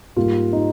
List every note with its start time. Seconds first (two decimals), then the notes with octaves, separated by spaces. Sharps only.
0.16 G#2 G3 A#3 F4
0.53 D#4